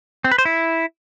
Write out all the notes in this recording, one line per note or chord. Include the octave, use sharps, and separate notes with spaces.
C4
B4
C5
E4